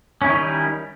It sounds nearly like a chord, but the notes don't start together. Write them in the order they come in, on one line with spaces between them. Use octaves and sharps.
C#4 E4 D#3 D#4 G3